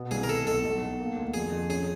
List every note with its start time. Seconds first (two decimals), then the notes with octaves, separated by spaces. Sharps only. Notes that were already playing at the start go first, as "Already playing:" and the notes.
Already playing: B2 B3
0.11 C2 G#4
0.23 A#4
0.29 A3 A4
0.46 B1 A4
0.64 B1
0.81 B1
1.00 A#3
1.17 D2
1.34 F2 G#4
1.52 F2
1.69 C#4 G#4